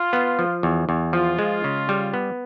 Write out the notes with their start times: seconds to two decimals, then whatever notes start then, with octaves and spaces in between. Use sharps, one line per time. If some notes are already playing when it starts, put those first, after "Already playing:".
Already playing: F4
0.13 B3
0.39 F3
0.63 E2
0.89 E2
1.13 F3 F4
1.39 G#3
1.64 C#3
1.89 G3
2.14 B3